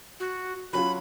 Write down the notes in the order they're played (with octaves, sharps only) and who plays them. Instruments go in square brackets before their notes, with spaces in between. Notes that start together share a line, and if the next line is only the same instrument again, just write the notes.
[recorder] F#4
[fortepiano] F#3 C#4 F4 [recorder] B5